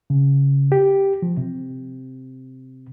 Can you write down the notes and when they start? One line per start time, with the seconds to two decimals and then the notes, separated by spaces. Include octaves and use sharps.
0.10 C#3
0.72 G4
1.22 F3
1.37 C3